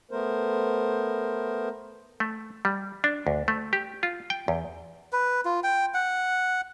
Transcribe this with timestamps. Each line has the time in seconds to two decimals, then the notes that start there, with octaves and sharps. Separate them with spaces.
0.11 A3 B3 A#4 C5
2.20 A3
2.65 G3
3.04 D4
3.27 D2
3.48 A3
3.73 G4
4.03 F4
4.30 G5
4.48 E2
5.12 B4
5.45 F4
5.63 G5
5.94 F#5